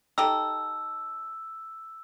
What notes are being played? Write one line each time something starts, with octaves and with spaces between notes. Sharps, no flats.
D#4 G4 A4 E6